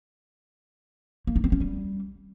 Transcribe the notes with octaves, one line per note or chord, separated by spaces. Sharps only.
A#3
D#4
C4
C#4
G3